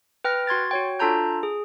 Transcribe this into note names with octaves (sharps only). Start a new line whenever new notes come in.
B4 G5 F6 A#6
F#4 C6 G#6 A6
F#4 C#5 G5
D4 F4 A4 A5 A#5 G6
G#4